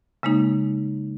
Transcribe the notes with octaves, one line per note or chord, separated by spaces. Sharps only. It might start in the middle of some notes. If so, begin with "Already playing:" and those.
C#3 G#3 A#3 D#4